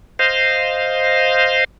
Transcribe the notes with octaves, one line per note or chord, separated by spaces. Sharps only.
C5 D#5 F5